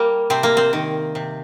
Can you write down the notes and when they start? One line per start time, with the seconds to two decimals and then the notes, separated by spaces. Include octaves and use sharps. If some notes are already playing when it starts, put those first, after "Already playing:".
Already playing: G3 A#3
0.30 C3 C4
0.43 A#3
0.57 C4
0.73 D#3
1.15 C3